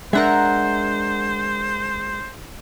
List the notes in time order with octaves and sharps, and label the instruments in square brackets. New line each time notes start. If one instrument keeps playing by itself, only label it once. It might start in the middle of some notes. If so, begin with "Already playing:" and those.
[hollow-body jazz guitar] G#3 D4 A#4 [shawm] C5 [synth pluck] E5 F#5 A#5